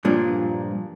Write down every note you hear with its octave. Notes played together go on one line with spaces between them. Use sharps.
G2 A#2 F3 D4